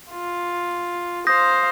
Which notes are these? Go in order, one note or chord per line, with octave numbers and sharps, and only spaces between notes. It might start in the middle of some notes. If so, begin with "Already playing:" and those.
F4
C5 F5 D#6 G6 A#6